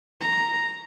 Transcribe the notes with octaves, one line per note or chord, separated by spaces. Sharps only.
A#5